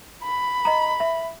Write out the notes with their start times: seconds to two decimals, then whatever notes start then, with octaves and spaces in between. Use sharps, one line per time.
0.23 B5
0.65 D#5 A#5
1.00 E5